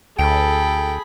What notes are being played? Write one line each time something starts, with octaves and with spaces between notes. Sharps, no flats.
D2 G#4 A4 G5 B5